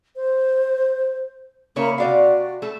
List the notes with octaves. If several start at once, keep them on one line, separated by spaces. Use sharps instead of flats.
C5
C#3 A#3 E4 C#5
C3 F#4 D5 F5
A3 A4